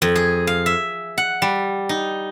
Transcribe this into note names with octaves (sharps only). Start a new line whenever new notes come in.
F2
G#4
F5
E5
F#5
G3
D#4